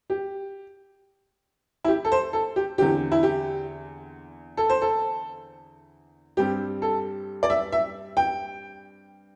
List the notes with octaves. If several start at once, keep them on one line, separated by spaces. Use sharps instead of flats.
G4
E4
G4
A4
C5
A4
G4
E2 D3 C4 G4
E4
G4
A4
C5
A4
G2 G3 C4 G4
A4
D5
E5
E5
G5